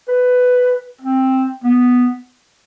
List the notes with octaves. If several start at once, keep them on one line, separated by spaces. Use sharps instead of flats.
B4
C4
B3